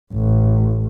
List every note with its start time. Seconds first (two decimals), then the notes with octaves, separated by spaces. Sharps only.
0.13 A1